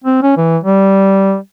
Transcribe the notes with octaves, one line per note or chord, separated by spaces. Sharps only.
C4
C#4
E3
G3